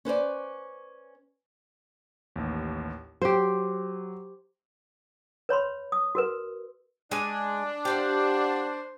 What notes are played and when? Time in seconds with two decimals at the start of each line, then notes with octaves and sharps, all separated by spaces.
0.05 C#4 B4 C5 D5
2.36 A1 D#2
3.22 F#3 G4 C5
5.49 B4 C#5 B5 C6
5.92 D#6
6.15 F#4 A#4 B4
7.11 G#3 D4 G#5
7.85 G4 C5 F5 F#5